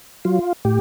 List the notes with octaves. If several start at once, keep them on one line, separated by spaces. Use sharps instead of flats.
F#3 F4
A2 G4